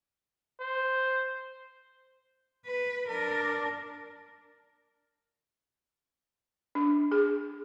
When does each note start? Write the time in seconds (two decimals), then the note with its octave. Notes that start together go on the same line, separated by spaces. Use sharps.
0.60 C5
2.65 B4
3.09 D4 A#4
6.75 D4
7.11 G#4